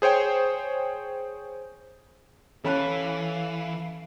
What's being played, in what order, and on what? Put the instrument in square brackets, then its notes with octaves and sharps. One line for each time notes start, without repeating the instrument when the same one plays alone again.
[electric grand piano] G#4 C5 C#5 G5
[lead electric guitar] E3 [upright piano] C#4 [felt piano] A4 B5 F#6 [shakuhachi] F5